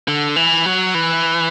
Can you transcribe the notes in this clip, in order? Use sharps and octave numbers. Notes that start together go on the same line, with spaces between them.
D3
E3
F#3
E3